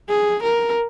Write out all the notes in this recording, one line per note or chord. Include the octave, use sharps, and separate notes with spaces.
G#4
A#4